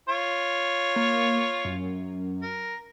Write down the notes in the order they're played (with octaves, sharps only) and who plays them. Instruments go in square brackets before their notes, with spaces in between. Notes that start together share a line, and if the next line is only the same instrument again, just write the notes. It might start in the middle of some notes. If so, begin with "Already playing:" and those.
[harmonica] F4 C#5
[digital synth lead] A#3
F#2
[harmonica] A#4